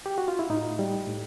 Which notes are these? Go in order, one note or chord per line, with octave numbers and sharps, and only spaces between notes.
G4
F#4
F4
E4
A2 D#4
G3
A2